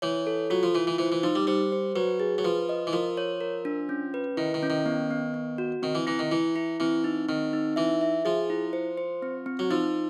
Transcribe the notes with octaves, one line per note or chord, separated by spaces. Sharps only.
E3 C#5
A4
F#3 F4
F3
E3 F4
E3
E3 C5
E3
F3 D#4
G3
G3 C5
C5
F#3 B4
G#4
F#3
F3 B4
D#5
E3
F3 A#4
C#5
A#4
D4
C#4
B4
D#3 E4
D#3
C#4
D#3
B3
B3
B3
F#4
D#3 C4
E3
E3 E4
D#3
E3 E4
E4
E3 C4
D#4
D#3 C4
D#4
E3 E5
E5
F3 G#4
E4
C5
C5
C4
C4
F#3
F3 D#4